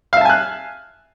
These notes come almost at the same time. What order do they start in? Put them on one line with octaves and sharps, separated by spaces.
F5 E5 A5 G#5 F#6